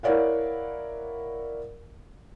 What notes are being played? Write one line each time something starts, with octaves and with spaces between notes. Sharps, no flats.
E4 A#4 C#5 D5 F5 F#5